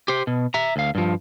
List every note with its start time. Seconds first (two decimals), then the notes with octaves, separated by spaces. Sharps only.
0.08 G4 C5
0.27 B2
0.54 E5 A#5
0.76 D2 F5
0.95 G2 F3